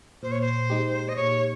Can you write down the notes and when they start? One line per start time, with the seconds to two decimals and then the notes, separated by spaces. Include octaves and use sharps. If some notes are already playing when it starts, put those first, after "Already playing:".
0.22 A#2 C5
0.31 C#5
0.41 C5
0.70 G#3 D#4 G4
1.08 D#5
1.16 A#2 C#5